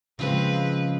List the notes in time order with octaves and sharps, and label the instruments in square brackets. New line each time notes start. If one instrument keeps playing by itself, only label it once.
[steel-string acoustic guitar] C#3 F3 G#3 [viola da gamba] C4 B4